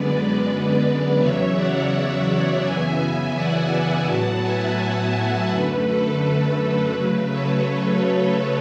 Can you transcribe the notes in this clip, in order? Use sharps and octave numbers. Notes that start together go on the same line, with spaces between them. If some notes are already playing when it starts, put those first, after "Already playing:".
Already playing: F#2 D3 G#3 B3 B4 D5
E2 C#3 F#3 C#5 E5
D5 F#5
F#2 C#3 E3 B3 E5 G#5
D5 F#5
A2 F#3 B3 F#5 A5
E5 G#5
E5 G#5
F#2 D3 A3 B4
A4
B4
C#3 F#3 A3
A4 C#5
B4
A4 C#5